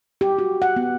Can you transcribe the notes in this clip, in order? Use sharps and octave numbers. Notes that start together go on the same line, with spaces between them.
G4
F#4
F#5
B3